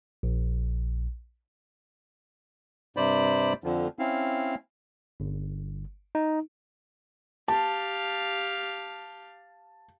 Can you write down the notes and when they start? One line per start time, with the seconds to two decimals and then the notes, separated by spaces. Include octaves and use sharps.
0.23 A#1
2.97 G2 C3 C5 D5 B5
3.64 F2 D3 F3
3.99 C4 C#4 E4 F5
5.20 G1
6.15 D#4
7.48 G4 F5 A5